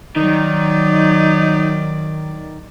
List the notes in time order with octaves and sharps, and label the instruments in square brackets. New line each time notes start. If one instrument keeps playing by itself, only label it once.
[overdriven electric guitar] D#3 [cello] F#3 D5 [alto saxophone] D#4